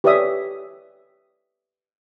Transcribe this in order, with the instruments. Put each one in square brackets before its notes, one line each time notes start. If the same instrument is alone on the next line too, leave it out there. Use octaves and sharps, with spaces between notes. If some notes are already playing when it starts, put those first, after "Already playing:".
[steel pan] G4 B4 C#5 D5 E5 D#6